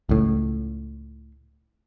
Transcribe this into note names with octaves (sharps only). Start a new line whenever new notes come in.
C#2 A2